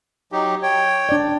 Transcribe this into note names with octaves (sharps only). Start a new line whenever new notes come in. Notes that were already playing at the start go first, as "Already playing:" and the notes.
F#3 D#4 G4
C#5 G5
D4 D5